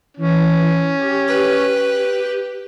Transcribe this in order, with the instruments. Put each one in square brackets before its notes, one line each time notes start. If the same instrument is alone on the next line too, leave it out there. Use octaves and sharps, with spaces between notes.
[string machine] E3 [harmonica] C#4
[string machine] G4
[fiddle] B4